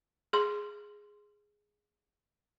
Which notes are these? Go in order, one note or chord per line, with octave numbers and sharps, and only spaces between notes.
G#4 C6